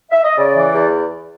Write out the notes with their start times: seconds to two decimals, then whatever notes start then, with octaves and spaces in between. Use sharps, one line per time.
0.11 E5
0.24 D#5
0.37 C#3 D5
0.55 E3
0.73 E2